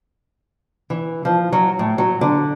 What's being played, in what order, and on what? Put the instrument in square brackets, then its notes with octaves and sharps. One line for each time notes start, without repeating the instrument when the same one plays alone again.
[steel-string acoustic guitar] E3
F3
F#3
A2
F#3
D3